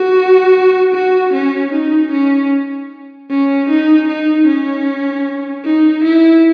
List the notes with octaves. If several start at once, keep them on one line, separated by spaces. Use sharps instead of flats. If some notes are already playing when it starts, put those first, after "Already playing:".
Already playing: F#4
F#4
C#4
D#4
C#4
C#4
D#4
D#4
C#4
D#4
E4